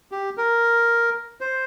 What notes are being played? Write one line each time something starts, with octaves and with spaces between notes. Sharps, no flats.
G4
A#4
C5